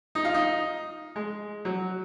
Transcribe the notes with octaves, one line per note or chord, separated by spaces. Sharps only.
D#4
F4
D#4
G#3
F#3